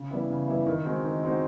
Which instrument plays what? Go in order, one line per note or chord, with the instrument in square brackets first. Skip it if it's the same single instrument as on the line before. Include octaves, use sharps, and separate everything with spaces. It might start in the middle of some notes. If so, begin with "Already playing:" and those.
Already playing: [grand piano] C#3
E3 G3 B3 E4
C#3
E3 G3 B3 E4
D#3
G#3 C4 D#4 F#4
D#3
G#3 C4 D#4 F#4